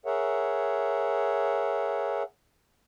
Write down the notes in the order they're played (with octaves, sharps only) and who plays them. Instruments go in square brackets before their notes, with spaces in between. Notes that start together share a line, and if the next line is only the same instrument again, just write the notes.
[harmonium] G#4 A#4 C#5 E5 F#5